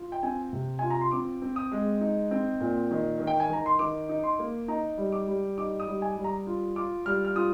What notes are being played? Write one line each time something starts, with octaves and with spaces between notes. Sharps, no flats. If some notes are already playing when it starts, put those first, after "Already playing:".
Already playing: F4
G5
C4 G#5
C3
F4 G#5
A#5
C6
C4 D6
C4
D#6
G#3
D#4
C4
A#2
D#3
D#3
G5
G#5
D#3 A#5
C6
D#3 D6
D#4
C6
A#3
D#4 A#5
G3
D6
G3
D#4 D6
D#6
G3
G#5
G3
A#5
F4
F4 D6
G3 F6
F6
F4 D#6